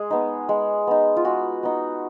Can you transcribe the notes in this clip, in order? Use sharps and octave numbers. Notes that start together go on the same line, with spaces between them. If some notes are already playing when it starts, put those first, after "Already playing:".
Already playing: G#3 G#4
B3 D#4
G#3
B3 D#4
F4
G#3 F#4
B3 D#4